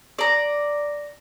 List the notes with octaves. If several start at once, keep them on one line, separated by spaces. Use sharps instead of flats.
D5 A#5